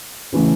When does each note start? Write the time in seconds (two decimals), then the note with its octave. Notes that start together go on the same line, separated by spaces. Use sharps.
0.33 C#3 E3 A3 C#4